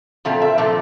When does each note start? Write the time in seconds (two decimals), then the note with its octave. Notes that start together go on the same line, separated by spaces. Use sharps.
0.25 A#2 F3 A3 C4 F5
0.42 E5
0.58 A#2 F3 A3 C4